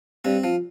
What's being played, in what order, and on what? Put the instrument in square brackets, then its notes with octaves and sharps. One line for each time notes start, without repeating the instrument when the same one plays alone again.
[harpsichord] G2 C4
F3